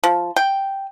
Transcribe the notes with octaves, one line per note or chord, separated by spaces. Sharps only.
F3
G5